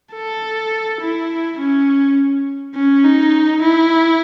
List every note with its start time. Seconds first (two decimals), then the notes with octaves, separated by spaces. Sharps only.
0.13 A4
1.01 E4
1.59 C#4
2.75 C#4
3.04 D#4
3.62 E4